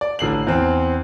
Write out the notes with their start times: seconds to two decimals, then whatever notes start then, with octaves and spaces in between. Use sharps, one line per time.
0.01 D5
0.19 A1 D3 C7 F#7
0.47 E2 C4